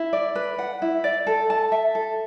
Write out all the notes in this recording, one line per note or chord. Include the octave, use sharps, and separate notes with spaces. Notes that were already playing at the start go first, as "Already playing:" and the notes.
Already playing: E4
D5
B4
F#5
E4
D5
A4
A5
E5
A4